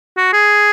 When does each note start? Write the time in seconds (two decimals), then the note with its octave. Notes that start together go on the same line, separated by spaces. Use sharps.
0.17 F#4
0.33 G#4